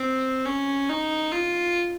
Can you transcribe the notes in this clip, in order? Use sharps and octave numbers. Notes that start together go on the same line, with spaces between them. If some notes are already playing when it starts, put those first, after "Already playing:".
Already playing: C4
C#4
D#4
F4